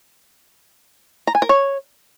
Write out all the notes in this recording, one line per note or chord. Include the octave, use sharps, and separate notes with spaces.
A#5
G#5
A#4
C#5